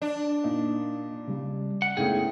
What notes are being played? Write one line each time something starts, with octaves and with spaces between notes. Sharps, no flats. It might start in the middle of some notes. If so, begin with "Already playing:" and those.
D4
A#2 A#3 D#4 D#5
C#3 G3
F#5
G#2 C#3 A3 B3 E4 G#4 G5